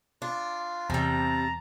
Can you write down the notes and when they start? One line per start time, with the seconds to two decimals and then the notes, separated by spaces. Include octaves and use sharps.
0.22 D4 F4
0.90 E2 C3 G3 A5 A#5